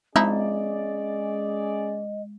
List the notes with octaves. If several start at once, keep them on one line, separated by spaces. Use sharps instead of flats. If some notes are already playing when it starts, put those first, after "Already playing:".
F3 G#3 C#4 D#4 E4 G#4 D5 D#5